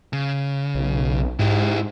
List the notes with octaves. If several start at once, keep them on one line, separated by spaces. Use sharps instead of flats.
C#3
B1
G#2 E4 G4